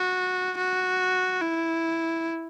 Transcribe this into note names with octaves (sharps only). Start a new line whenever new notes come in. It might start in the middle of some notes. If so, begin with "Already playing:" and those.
Already playing: F#4
F#4
E4